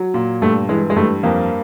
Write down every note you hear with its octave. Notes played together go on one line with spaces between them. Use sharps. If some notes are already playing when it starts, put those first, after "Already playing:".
Already playing: F#3
A#2
G2 A3
E3 G#3
G#3
G2 A3
F2 A#3